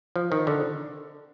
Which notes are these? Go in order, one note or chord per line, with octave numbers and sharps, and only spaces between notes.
F3
D#3
D3